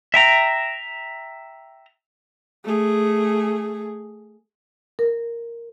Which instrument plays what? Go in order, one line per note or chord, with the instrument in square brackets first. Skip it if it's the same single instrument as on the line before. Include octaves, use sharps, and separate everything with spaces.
[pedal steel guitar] E5 G5 A#5
[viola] A3 G#4
[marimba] A#4